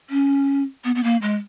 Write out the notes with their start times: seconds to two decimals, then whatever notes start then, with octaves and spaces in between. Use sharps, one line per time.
0.10 C#4
0.84 B3
0.95 B3
1.03 A#3
1.22 G#3